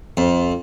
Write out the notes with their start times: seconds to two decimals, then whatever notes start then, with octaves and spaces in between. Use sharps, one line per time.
0.17 F2